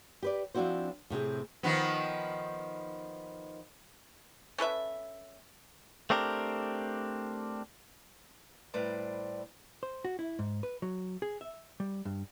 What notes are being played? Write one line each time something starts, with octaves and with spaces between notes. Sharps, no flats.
G4 B4 D5
F3 C4 D4 E4 F#4 C5
A2 C3 C4 G#4
D#3 F3 B3
C#4 A4 B4 E5
A3 C4 D4 G4 A#4
A2 G3 B4 C5 D5 A#5
C5
F#4
E4
G#2
B4
F#3
G#4
E5
G3
G2